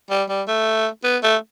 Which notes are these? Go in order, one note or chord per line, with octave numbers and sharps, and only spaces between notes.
G3
G3
A3
B3
A3